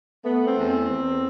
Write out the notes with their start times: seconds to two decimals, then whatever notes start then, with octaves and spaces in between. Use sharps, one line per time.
0.24 A3 B3
0.45 C4
0.57 E2
0.68 C4
0.89 E2